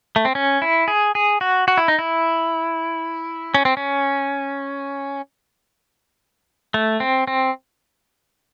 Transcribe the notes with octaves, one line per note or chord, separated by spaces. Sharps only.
A3
C4
C#4
E4
G#4
G#4
F#4
F#4
E4
D#4
E4
C#4
C4
C#4
A3
C4
C4